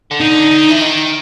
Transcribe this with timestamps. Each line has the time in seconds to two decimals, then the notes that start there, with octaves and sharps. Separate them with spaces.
0.11 D3
0.20 D#4
0.31 D3
0.51 D3
0.68 E3
0.80 D#3